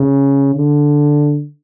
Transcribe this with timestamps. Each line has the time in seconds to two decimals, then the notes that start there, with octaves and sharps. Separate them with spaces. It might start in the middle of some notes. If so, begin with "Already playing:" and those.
Already playing: C#3
0.56 D3